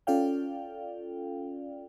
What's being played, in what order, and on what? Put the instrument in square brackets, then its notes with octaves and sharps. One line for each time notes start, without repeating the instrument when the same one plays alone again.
[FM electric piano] C#4 F4 A4 D5 F5 G5